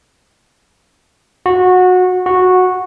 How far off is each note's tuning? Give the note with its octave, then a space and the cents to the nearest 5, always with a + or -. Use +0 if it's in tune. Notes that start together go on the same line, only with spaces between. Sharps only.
F#4 -20
F#4 -10